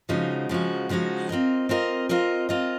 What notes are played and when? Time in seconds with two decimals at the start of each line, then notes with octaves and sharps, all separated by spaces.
0.09 C#3 F3 G#3 D#4 F#4
0.49 C#3 F3 G#3 D#4 F#4
0.89 C#3 F3 G#3 D#4 F#4
1.29 C4 F4 A#4 D#5
1.69 C4 F4 A#4 D#5
2.09 C4 F4 A#4 D#5
2.49 C4 F4 A#4 D#5